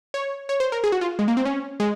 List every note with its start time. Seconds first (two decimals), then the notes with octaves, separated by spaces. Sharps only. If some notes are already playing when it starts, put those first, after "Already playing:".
0.14 C#5
0.49 C#5
0.60 C5
0.72 A#4
0.84 G#4
0.92 F#4
1.01 F4
1.19 G#3
1.28 A#3
1.37 C4
1.45 C#4
1.80 G#3